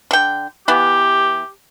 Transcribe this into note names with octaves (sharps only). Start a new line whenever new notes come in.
D3 G5
E3 B3 G4